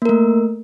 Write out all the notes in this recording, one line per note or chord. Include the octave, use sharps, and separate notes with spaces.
A3 A#3 A#4